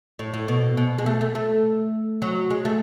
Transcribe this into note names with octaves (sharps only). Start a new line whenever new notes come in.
A2
A2
B2
B2
G#3
A3
A3
A3
F#3
G#3
A3